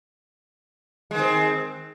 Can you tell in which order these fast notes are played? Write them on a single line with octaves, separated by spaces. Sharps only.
G#3 D#3 C4